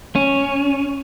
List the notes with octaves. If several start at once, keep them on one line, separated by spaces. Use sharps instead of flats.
C#4